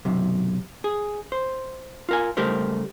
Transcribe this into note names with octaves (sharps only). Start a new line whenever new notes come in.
B1 F#2 C3
G#4
C5
F4 A#4 G#5
C#2 G3 A3 G4 A#4 C5